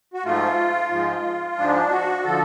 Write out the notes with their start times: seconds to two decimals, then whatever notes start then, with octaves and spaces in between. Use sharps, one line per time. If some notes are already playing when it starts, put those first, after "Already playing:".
0.13 F#4
0.25 G#2 F3 A3 F4
0.91 G#2 F3 G#3
1.57 G#2 F3 G#3 D4
1.90 F#4
2.24 D3 F3 A4